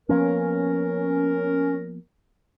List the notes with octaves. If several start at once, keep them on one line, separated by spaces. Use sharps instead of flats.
F3 A#3 B3 C#4 A#4